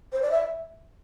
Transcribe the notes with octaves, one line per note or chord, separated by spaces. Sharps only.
C5
D5
E5